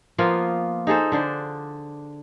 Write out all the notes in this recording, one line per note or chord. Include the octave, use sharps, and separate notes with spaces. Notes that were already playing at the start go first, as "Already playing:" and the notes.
F3 A#3 B3 F4
D#4 G#4 A4 C5
D3 D4 C5